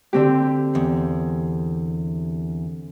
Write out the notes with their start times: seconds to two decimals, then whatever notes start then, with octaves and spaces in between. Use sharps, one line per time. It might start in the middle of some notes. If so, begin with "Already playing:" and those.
0.13 D3 C4 G4
0.75 E2